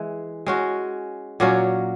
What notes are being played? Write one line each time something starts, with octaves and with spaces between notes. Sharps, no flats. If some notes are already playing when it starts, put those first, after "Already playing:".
Already playing: E3 G#3
G#3 C#4 F#4
A#2 F#3 A#3 C#4